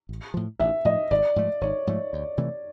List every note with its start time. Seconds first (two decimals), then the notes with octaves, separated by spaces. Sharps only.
0.09 A1
0.34 A2 F3
0.60 A1 E5
0.85 A2 F3 D#5
1.10 G#1 D5
1.36 G#2 F3 A3
1.61 G#1 C#5
1.87 G#2 F3 A3
2.13 D2
2.38 C3 E3 A3